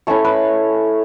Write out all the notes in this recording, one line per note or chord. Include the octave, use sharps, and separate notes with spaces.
A3 C#4 E4 C#5
B4